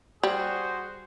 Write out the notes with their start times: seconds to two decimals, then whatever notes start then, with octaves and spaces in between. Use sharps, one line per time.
0.23 G3 F#4 G#4 C5